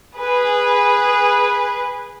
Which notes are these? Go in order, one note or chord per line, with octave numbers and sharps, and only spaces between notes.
G#4 B4